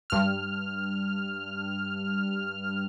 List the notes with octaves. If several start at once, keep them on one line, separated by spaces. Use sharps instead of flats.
G2 F6